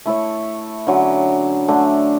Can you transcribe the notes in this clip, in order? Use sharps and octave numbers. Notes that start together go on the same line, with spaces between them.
A3 E4 A4 C#5
D3 F#3 C#4
D3 A3 D4 A4